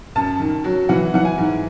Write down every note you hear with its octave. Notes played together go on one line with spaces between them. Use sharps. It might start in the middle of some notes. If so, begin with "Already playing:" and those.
F#2 A5
D#3
F#3
E3 F#5
E3 F#5
G#5
G#2